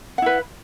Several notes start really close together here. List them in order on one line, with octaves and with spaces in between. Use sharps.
F#5 E4 B4